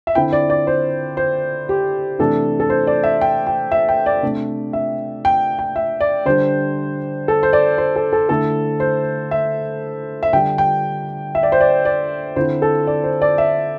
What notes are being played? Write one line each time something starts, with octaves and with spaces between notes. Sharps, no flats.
E5
D3 C4 E4 G5
D5
D5
C5
C5
G4
C3 E3 A3 D4 A4
A4
C5
D5
E5
G5
G5
E5
G5
D5
C3 A3 D4
E5
G5
G5
E5
D5
D3 G3 D4 C5
A4
C5
D5
C5
A4
A4
D3 A3 E4 A4
C5
E5
E5
D3 G3 D4 G5
G5
E5
D5
C5
D5
D5
D3 C4 E4 C5
A4
D5
C5
D5
E5